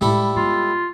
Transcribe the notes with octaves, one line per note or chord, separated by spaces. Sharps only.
A2 G3 G#3 E4 A4
G#3 B3 F4